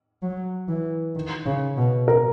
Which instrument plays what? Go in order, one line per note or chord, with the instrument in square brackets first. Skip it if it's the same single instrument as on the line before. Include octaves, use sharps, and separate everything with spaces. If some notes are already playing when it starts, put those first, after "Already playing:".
[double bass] F#3
E3
D#3
C#3
B2
[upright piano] A#4